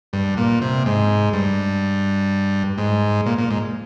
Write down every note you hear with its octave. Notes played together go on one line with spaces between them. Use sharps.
G2
A#2
C3
G#2
G2
G#2
A#2
A#2
G#2